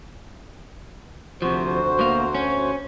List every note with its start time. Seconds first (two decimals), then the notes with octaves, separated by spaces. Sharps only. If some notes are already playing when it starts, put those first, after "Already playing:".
1.42 D2 C3 F3 F#4 C5
1.99 B2 A#3 F5
2.35 C#4